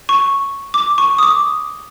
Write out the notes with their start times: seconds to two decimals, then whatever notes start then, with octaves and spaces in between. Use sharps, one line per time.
0.09 C#6
0.74 D6
0.98 C#6
1.18 D#6
1.23 D6